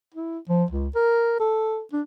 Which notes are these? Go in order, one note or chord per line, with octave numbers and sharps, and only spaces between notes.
E4
F3
C#2
A#4
A4
D4